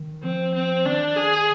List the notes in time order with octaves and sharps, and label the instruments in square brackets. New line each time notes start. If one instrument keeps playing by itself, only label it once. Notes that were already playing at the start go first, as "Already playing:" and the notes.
Already playing: [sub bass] D#3
[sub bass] F3 [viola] C4
[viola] C4
[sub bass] D#3 [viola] D4
[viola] G#4